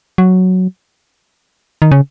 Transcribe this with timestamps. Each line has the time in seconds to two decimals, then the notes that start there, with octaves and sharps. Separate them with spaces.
0.18 F#3
1.82 D#3
1.91 C#3